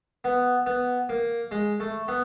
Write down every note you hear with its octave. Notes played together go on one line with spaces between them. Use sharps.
B3
B3
A#3
G#3
A3
B3